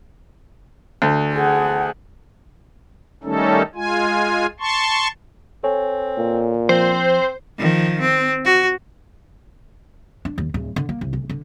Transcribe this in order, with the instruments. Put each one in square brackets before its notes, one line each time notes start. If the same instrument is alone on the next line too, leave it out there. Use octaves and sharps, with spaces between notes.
[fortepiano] D2
[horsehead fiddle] G#4 F#5
[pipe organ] D#3 G3 A3 C#4 D#4 A4
G#3 F4 G#5
A5 C6 C#6
[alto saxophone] C4 [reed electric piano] A4 C#5 G#5
[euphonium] A#2
[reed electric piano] F3 [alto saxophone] C4 [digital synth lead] C5
[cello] D#3 F3
C4
F#4
[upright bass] D4
D#2
D1
D3
A#3
C2
D2
D3